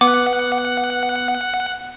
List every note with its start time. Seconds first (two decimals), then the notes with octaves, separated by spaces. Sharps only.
0.01 B3 F#5 D6